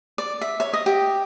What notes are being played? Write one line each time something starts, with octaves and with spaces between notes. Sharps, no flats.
D5
E5
C#5
D#5
G4